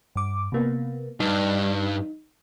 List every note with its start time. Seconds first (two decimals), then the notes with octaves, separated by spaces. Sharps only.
0.15 G2 D6
0.52 C3 A#3 B3
1.20 G2 D#4